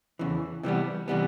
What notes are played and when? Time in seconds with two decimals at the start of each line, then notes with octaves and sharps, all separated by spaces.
0.19 E2 C#3 E3
0.63 C3 E3 G3 B3
1.08 C3 E3 G3 B3